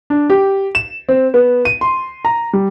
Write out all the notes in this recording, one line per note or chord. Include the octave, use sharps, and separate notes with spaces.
D4
G4
E7
C4
B3
D#7
C6
A#5
G3